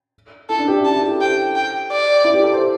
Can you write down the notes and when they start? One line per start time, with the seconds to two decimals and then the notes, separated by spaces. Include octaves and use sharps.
0.49 E4 A4
0.59 D4
0.68 G4
0.76 E4
0.85 D4 A5
0.94 E4
1.03 G4
1.12 A4
1.20 C5 G5
1.56 G5
1.92 D5
2.24 E4
2.34 G4
2.43 A4
2.53 C5